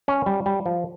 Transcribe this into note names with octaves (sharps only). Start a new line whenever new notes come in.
C#4
G3
G3
F3